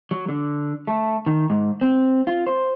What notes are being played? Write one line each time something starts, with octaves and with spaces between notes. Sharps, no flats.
F#3
D3
A3
D#3
G#2
C4
F4
C5